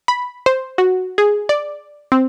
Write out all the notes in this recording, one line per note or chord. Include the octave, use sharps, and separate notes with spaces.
B5
C5
F#4
G#4
D5
C4